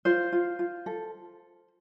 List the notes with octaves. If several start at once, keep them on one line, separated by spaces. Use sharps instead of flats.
F4 C5
F4
F4
A4